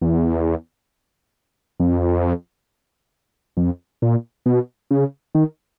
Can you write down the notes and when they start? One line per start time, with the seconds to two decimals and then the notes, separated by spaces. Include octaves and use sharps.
0.01 E2
1.80 F2
3.57 F2
4.02 A#2
4.46 B2
4.91 C#3
5.35 D#3